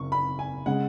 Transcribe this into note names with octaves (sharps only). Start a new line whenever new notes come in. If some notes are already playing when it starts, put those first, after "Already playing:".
Already playing: F#1 C#6
B5
G#5
C#3 G#3 F#5